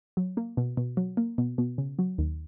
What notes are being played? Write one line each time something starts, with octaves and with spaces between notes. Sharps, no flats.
F#3
A#3
B2
B2
F#3
A#3
B2
B2
C#3
F#3
D#2